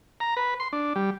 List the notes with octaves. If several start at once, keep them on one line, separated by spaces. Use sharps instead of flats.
A#5
B4
C6
D4
G3